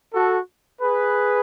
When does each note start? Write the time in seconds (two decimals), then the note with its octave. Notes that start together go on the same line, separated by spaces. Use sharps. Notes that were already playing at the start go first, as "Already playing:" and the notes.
0.14 F#4 A4
0.81 G#4 B4